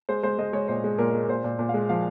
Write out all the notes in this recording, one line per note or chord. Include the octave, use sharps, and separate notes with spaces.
G#3 C5
G#3 C5
G#3 D#5
G#3 C#5
A#2 C5
G#3
A#2 A#4
G#3
A#2 C5
A#2
A#2
F5
G#3
F3 F5